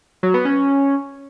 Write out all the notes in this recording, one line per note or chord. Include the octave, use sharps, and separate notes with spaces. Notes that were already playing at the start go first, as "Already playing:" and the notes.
F#3
B3
C#4